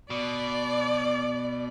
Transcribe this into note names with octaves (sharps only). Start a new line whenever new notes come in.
B2 D5